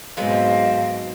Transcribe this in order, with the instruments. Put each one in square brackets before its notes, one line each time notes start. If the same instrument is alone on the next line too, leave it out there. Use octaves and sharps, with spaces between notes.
[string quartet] G#2 B2 C4 [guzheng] F#3 G#3 B3 [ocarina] F5